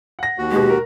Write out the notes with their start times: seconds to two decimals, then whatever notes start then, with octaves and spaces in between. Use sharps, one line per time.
0.19 F#5 A#6
0.38 D#2 F#4
0.52 B2 G#3 G4
0.70 A#4